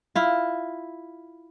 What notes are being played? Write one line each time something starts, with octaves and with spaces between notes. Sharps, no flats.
E4 F4